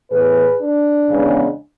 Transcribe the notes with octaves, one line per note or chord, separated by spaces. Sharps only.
A2 E3 B3 G#4 B4
D4
E2 C#3 G#3 B3